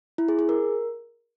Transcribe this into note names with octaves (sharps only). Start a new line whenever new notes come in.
E4
G#4
G#4
A#4